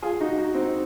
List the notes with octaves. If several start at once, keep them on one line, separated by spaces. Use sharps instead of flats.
F4 G#4
D#4 F#4
D#4 F#4
C4 D#4